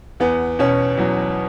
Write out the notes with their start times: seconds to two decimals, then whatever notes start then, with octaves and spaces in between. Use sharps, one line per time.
0.20 E2 B3
0.59 B2 C#4
0.97 E2 F#3